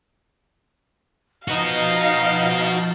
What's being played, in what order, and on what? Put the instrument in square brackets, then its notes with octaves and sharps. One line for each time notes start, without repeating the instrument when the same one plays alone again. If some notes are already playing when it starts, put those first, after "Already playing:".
[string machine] F3 A5 G6 [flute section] D#4 [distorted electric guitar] F#4 B4 [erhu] F5